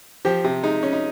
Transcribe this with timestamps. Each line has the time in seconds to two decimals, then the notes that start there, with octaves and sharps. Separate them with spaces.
0.25 F3 G4
0.44 C3
0.63 G#3 D#4
0.83 C#4
0.93 D#4